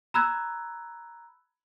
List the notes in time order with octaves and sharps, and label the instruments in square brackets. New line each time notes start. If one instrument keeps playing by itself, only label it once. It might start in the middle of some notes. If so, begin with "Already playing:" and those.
[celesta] A#5 B5 E6 F#6 G#6